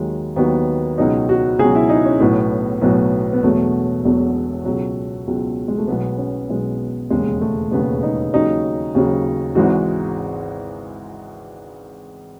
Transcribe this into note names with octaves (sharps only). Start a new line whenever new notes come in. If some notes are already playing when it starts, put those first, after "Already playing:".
Already playing: D#2 D#3 F#3 G#3
D#2 D#3 F#3 B3
C#2 B2 F#3 D#4
F#4
C#2 B2 F#3 G#4
E4
D#4
C#4
B1 A2 F#3 B3
B1 A2 F#3 B3
B3
E1 E2 B2 F#3 A3
E1 E2 B2 F#3
C#2 B2 F#3
C#2 B2 F#3
G#3
A3
B1 B2 G#3 B3
C#4
B1 B2 G#3
E1 D#2 C#3 G#3
A3
E1 D#2 C#3 G#3 B3
D#4
D#2 C#3 F#3 D#4
D#2 C#3 F#3
G#1 G#2 E3 G#3 F#4